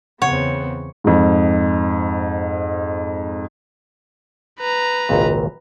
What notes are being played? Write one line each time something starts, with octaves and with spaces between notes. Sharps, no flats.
E2 C#3 B3 C4 C#5 F#5
F2 G#2
B4 A#5
G#1 C#2 A#2